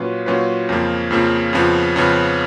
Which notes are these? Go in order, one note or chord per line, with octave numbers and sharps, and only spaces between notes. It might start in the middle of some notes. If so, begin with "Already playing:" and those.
Already playing: A#2 F#3 C#4 F4 B4
A#2 F#3 C#4 F4 B4
F2 C#3 F3 A#3
F2 C#3 F3 A#3
F2 C#3 F3 B3
F2 C#3 F3 B3